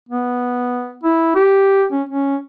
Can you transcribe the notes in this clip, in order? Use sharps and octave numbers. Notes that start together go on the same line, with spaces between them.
B3
E4
G4
C#4
C#4